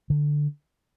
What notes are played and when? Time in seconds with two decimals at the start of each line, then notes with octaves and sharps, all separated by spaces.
0.10 D3